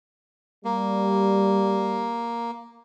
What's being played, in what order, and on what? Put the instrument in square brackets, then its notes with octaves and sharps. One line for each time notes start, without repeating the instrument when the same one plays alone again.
[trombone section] G3 [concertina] A#3